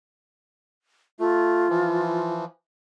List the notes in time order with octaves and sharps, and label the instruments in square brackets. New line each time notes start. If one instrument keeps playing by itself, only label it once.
[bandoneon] A3 [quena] F4
[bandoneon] E3 F3